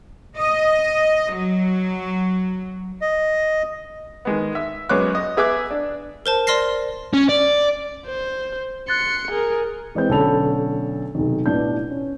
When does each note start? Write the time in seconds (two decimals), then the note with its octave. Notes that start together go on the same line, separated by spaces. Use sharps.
0.38 D#5
1.33 F#3
3.01 D#5
4.25 D#3 G#3 B3
4.55 E5
4.89 F#2 G#3 B3 C#5 D6 F#6
5.15 D#5
5.37 B3 G#4 E5 D6 F#6
5.70 D4
6.26 A#4 C5 A5
6.47 D5 C6 F6 A#6 C7
7.14 C#4
7.29 D5
8.07 C5
8.88 C6 F#6 A6 C#7
9.31 G#4 A#4
9.95 E3 G#3 C4 G6
10.09 B1 D3 C#4 A4 B5 F7
11.15 B1 C3 D#3
11.46 A1 B2 D4 D#4 G6
11.90 C#4